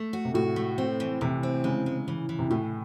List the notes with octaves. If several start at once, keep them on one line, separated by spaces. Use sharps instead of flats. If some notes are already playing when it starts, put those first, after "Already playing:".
Already playing: A3
F#4
C3
A2 F#4
A3
C4
E3
C3 E3
C4
C#3 G#3
G#3
E3
E3
C3
A2 E3